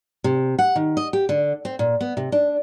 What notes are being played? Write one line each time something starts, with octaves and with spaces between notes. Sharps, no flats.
C3
F#5
D#3
D#5
G4
D3
C4
A#2
B3
C3
D4